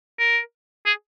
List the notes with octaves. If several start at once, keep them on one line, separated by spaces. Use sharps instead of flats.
A#4
G#4